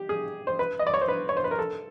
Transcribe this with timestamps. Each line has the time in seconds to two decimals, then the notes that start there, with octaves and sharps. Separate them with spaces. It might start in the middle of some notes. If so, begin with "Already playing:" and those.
Already playing: G4
0.09 G#4
0.47 C5
0.59 B4
0.79 D#5
0.87 D5
0.94 C#5
1.01 C5
1.08 B4
1.29 C#5
1.37 C5
1.44 B4
1.51 A#4
1.59 A4